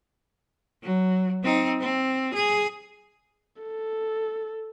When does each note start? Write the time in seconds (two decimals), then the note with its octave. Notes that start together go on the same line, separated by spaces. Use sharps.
0.83 F#3
1.43 C4 D#4
1.80 C4
2.34 G#4
3.62 A4